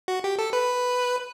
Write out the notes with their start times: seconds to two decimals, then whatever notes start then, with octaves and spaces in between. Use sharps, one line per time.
0.08 F#4
0.24 G4
0.39 A4
0.53 B4